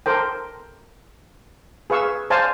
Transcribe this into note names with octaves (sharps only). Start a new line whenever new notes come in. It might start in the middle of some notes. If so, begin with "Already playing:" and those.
A4 A#4 C5 G5
G#4 B4 F5 C#6 E6
C5 D5 F5 G#5 A5